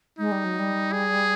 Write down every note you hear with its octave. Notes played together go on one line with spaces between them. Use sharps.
G#3 D#4
G3
F#3
G3
G#4